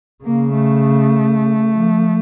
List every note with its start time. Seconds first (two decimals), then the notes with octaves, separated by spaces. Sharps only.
0.24 C#3 A#3
0.53 A3
1.74 F3